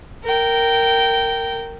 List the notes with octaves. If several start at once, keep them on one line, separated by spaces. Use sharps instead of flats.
A#4 G5